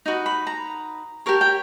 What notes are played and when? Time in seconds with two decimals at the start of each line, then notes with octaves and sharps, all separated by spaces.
0.06 D#4 F#4 B4
0.26 B5
0.47 A#5
1.26 G4 A#4 C#5 A5
1.41 G5